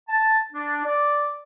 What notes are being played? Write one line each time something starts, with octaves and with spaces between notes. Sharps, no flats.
A5
D4
D5